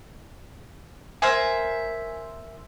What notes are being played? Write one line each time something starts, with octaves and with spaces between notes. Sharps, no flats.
A#4 C5 E5 G#5